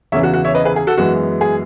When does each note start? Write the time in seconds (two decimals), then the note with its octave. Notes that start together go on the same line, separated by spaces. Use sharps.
0.12 E2 C#3 E3 C#5 E5
0.23 F#4
0.34 F#4
0.44 C#5 E5
0.55 B4 D#5
0.65 G#4 B4
0.76 G#4
0.87 F#4 A4
0.98 F#2 E3 G#3 B3 F#4
1.41 G#4